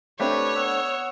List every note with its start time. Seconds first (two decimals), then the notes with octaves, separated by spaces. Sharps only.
0.20 A3 C4 D4 G4 B4 C#5
0.56 B3 F#5 E6